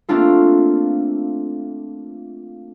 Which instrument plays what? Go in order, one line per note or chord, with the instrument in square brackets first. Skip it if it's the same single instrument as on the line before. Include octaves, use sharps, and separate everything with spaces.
[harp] A3 A#3 C4 D4 F4 A4